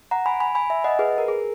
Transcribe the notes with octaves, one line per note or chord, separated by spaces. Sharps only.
F#5 A#5
G#5 B5
G#5 B5
G#5 B5
E5 G#5
D#5 F#5
G#4 B4
A#4
G#4